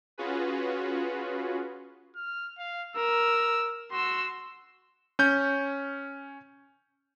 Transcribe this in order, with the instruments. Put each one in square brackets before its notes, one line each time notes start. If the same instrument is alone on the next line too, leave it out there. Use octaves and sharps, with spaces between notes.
[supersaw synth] C#4 F4 F#4 G#4 B4
[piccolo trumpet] F6
F5
[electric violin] A#4 [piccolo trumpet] E6
[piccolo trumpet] F#4 [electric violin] C6 E6
[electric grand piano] C#4 G6